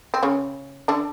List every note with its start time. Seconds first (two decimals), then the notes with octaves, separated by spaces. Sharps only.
0.14 C4
0.23 C#3 C#4
0.88 D3 D4